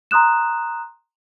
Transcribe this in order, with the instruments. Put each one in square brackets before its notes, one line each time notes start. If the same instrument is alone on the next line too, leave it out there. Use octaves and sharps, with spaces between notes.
[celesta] A#5 C6 D#6 F#6 E7